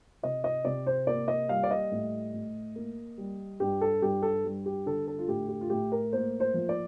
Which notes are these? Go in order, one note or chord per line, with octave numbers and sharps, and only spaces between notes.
C3 D#5
D#5
C3 D5
C5
A#3 D5
D#5
G3 F5
D5
D#5
A2
A2
A#3
G3
G2 G4
A4
G2 G4
A4
G3
G4
D3 A4
A4
F4
A2 G4
G4
F4
A2 G4
A#4
A#3 C5
C5
F3
D5